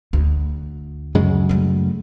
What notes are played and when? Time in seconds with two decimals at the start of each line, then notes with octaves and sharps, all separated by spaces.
0.13 D2
1.15 F#2 C#3 G#3
1.49 G3 A3